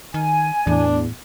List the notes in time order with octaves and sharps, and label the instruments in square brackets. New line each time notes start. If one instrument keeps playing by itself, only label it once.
[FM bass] D#3 [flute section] G#5
[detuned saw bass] E2 [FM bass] A2 [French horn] D4